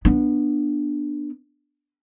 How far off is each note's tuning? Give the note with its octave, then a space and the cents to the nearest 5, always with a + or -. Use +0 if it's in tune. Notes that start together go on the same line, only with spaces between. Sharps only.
B3 -20 D4 +5